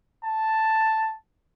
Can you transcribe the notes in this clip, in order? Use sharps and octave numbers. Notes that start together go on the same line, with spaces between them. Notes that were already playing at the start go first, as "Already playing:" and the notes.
A5